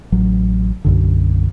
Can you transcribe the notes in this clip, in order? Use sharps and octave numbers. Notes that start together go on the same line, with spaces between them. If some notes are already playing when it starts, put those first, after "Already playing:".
A1 F#3
B1 F#2 D3